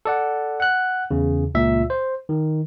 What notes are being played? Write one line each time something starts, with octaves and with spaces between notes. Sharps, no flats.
A4 D5 F#5
F#5 F#6
E2 C#3
C#2 A#2 E5
C5
D#3